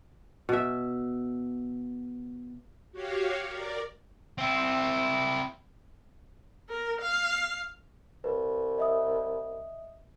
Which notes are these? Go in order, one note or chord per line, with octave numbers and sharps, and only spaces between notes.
B2 E5
F#4 G4 C#5 F5
A#4 D5
C4 E4
A#4
F5
C2 B4
D#5 E5 D#6